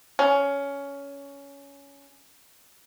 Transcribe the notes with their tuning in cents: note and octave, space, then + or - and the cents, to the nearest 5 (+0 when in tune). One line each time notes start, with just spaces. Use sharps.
C#4 +15